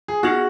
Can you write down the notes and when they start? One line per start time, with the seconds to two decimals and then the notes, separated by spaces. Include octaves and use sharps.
0.08 G#4
0.23 B3 D#4 F#4 G#4